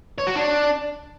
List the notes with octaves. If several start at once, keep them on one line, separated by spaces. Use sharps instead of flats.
C#5
F#4
D4